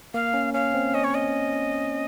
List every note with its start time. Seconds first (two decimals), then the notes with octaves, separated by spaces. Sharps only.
0.14 A#3 F5
0.34 C#4
0.54 C#4 F5
0.74 C4
0.94 C#4 D#5
1.04 C#5
1.15 D#5